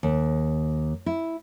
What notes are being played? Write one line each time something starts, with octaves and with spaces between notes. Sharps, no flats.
D#2
E4